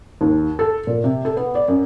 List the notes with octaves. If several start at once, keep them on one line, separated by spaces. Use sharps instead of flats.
D#2
A4
A#2
C3
A4
B3
D5
F#2